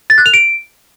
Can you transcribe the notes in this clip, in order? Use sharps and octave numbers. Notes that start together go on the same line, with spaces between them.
A6
F#6
F7
D7